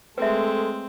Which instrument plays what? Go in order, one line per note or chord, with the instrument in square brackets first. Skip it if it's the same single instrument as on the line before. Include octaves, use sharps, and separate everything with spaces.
[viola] G#3 A3 [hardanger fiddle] C4 [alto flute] A4 [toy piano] B4 E5